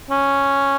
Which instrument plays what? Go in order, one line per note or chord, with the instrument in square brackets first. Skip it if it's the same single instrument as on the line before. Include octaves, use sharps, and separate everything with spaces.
[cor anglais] C#4